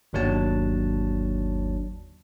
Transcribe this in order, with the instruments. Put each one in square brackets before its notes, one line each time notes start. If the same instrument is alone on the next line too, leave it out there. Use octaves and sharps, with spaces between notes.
[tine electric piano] G1 D#2 F#3 D4 C#5 A5